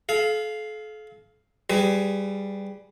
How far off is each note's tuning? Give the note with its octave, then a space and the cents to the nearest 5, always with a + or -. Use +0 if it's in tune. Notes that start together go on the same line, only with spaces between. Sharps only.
A4 -40 F5 +0
G3 +0 G#4 +0 B4 +35